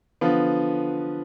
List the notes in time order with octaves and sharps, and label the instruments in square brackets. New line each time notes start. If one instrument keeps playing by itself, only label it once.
[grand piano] D3 F3 B3